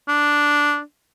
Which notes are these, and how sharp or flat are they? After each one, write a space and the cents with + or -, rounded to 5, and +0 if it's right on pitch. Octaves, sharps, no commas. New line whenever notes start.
D4 -5